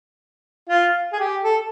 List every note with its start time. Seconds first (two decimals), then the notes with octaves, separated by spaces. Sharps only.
0.69 F4
1.13 G#4
1.19 G4
1.44 A4